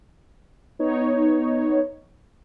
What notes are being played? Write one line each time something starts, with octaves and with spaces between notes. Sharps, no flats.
B3 D#4 C#5